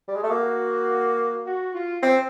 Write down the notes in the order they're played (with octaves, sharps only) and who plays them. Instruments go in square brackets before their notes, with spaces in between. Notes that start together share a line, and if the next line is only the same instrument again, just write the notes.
[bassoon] G3
G#3
A3
[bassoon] A#3 [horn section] F#4
[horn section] F#4
F4
[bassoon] C4